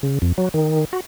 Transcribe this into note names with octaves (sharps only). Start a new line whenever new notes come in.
C#3
F2
F#3
D#3
F#4